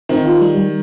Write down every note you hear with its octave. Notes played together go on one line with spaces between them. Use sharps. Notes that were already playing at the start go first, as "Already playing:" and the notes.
D#3 C4
F4
G3
G3